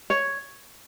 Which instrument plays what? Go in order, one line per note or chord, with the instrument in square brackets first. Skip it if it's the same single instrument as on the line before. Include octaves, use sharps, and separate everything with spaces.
[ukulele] C#5